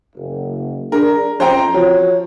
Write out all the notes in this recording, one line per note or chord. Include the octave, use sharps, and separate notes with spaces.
F#1
D4 G#4 A#4
F2 C#4 C5 G5 A#5
F3 F#4 C#5